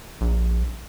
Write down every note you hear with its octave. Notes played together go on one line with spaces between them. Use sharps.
A#1